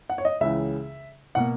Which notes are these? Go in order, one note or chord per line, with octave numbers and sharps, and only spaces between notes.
F#5
C#5
D#5
C#2 C#3 E3 E5
B2 A#3 F#5